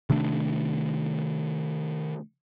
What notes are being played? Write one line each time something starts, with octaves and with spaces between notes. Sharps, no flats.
C3 D#3 A3 D4